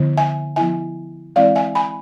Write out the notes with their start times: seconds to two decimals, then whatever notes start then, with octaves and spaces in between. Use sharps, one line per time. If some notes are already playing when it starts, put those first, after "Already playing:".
Already playing: D3 F3 B3 E4
0.17 E5 G#5
0.56 F3 B3 E4 E5 G#5
1.36 E3 G#3 C4 E4 D5 F5
1.55 E5 G#5
1.75 G#5 B5